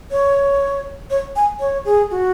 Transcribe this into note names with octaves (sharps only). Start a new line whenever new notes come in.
C#5
C#5
G#5
C#5
G#4
F#4